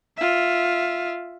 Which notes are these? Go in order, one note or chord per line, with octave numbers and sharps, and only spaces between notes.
F4 E5